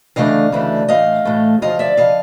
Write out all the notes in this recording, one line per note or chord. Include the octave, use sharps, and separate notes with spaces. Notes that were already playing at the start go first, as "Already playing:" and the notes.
D2 C#3 E3 A3 D4 D#5 F5
D2 C#3 E3 A3 D4
A2 E3 A3 D#5 F5
A2 E3 A3
D2 C#3 F3 D#5 F5
D5 E5
C#3 F3 D#5 F5